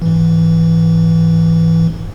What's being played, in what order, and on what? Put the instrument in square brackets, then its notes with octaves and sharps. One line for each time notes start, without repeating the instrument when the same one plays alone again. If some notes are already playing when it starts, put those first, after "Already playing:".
[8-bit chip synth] G#2 E3